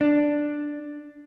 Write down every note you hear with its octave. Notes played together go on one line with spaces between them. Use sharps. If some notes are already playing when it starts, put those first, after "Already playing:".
D4